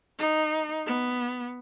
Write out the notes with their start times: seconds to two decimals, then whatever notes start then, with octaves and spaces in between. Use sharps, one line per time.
0.19 D#4
0.86 B3